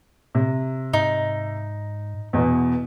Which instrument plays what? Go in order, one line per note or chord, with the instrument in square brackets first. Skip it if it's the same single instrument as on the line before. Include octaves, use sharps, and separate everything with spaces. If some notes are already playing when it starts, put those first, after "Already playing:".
[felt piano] C3
[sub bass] G#2 [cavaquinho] D#4
[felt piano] E2 B2 [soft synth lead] B3